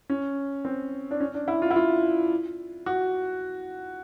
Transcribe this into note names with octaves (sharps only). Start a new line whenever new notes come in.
C#4
C4
D4
C#4
D4
E4
F4
E4
F4
F#4